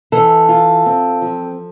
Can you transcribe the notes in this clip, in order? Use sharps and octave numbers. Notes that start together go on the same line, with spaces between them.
E3 A4
F4
C4
F3